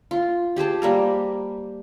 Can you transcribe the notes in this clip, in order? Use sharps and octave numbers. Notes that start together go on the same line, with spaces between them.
F4
G4 G#4 C5 A5
G3 A#3 A#4